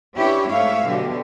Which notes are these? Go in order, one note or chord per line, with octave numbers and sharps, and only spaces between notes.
C#4 D4 E4 G4 B4 C#5
G#2 A3 C#5 E5 F5
B2 D3 F#3 G4